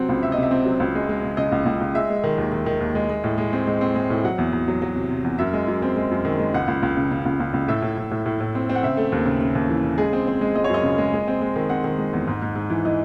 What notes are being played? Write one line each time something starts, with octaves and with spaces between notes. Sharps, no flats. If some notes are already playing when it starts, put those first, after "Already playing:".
Already playing: C3 F#3 C4 F#5
C#2
C3 E5
D#5
C3
E5
C4
F#3
C#2
G#3
G#3
C#3
C#3 D#5
C#2
C#2
C#2
G#3 E5
G#3
D#3
D#2
D#3
D#3
D#2
G#3
G#3
A2
G#3
C4
G#3
C4
G#3
A2
F#3 F#5
E2
E2
F#3
F#3
C3
C3
E2
F#2 E5
G#3
F#2
C4
G#3
F#2
D#3
G#3
C#2 F#5
C#2
C#2
C#3
C#3
C#2
C#2
C#2
A2 E5
A2
A2
A2
A2
A2
C4
C4
F#5
C#3 E5
A3
D#2
C#3
C#3
D#2
E3
C#3
G#3 G#4
C4
C4
G#3
G#3 D#5
C#5
F#2 D#5
C#3
G#3
G#3
C4
G#3
D#3
C4 F#5
D#3
G#3
E2
G#2
G#2
G#2
E3
E3 D#5